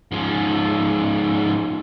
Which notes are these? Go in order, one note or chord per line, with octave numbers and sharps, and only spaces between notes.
G#2 F3